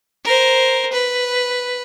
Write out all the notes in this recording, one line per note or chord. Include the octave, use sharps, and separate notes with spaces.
A#4 C5
B4